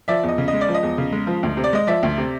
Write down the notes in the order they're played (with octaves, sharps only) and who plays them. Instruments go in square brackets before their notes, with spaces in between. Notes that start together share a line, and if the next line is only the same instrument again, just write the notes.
[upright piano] F3 D5 E5
E2
D#5
C#3
D#5
G#3
D5
F3
D#5
E2
C#3
G#3
F3
D2
C3
D5
G#3 D#5
F3 D5 E5
D2
C3